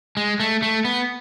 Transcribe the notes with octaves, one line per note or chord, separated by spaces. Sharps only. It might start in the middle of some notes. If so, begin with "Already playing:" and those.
G#3
A3
A3
B3